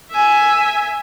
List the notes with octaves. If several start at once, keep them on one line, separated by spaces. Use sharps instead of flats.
E5 G#5